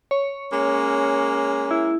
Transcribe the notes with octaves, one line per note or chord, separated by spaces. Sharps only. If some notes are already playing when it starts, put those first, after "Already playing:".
C#5
G#3 A#3 C#4
E4